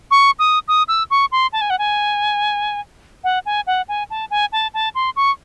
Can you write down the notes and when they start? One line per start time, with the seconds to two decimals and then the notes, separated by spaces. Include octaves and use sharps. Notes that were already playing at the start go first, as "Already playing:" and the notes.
0.11 C#6
0.39 D#6
0.68 D#6
0.88 E6
1.10 C#6
1.32 C6
1.53 A5
1.61 G#5
1.70 F#5
1.79 G#5
3.24 F#5
3.46 G#5
3.67 F#5
3.88 G#5
4.10 A5
4.31 G#5
4.52 A5
4.74 A5
4.95 C6
5.16 C#6